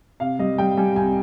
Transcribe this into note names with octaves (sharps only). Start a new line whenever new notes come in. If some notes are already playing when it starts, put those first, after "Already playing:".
C3 F5
G3 D#5
G3 G5
G3 G#5
C2 G#5